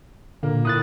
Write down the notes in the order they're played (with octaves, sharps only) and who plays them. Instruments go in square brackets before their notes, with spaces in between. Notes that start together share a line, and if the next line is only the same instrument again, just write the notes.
[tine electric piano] A#2 D3 [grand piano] A#3
[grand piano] A2 [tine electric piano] D#6 F#6 A6